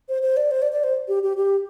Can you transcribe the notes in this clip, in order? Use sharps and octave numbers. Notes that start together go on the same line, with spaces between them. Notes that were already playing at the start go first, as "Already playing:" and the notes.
C5
C5
D5
C5
D5
D5
C5
G4
G4
G4